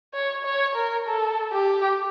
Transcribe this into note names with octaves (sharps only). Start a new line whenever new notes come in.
C#5
C#5
A#4
A4
G4